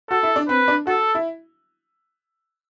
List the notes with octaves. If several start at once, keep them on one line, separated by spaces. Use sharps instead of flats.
F#4 A4
E4
D4
C4 B4
D4
F#4 A4
E4